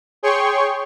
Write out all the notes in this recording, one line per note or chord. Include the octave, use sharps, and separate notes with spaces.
G#4 C#5 G5 C6 C#6